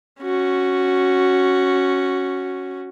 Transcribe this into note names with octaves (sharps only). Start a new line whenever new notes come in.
C#4 F#4